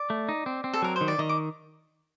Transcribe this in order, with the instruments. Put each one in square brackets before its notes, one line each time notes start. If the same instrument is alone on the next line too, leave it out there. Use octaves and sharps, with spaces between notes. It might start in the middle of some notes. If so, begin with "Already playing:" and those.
Already playing: [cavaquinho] D5
[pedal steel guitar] A3
D#4
C4
C4
[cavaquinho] A4
[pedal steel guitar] F#3 [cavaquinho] A#4
[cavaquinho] C5
[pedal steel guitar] D#3
[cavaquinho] D5
[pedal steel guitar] D#3 [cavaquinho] D#5
[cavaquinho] D6